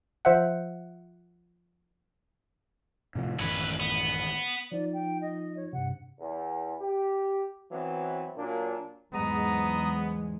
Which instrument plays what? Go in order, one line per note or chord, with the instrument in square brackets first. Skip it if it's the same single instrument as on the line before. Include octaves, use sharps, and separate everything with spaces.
[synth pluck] F3 C5 E5 F#5
[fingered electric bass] A2 C3 F3
[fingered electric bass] A1 F#2 D#3 [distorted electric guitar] C#4 B4
[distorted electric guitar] B3
[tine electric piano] F3 D#4 F4 [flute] D5
[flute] G5
D#5
C#5
[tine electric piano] G2 C3 [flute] F#5
[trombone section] E2
G4
E3 F#3 B3 C4
A#2 F#3 A#3 D4
[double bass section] E2 G#2 G#3 [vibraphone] F#3 [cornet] B3 [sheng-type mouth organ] A#5 D#6